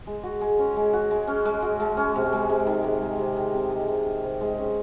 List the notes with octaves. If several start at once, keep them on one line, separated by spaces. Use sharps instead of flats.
G#3
F#4
G#3
C#4
G#3
F#4
G#3
C#4
G#3
F#4
G#3
C#4
C3
G#3
C3
D#3
C3
G#3
C3
D#3
C3
G#3
C3
D#3
C3
G#3
C#4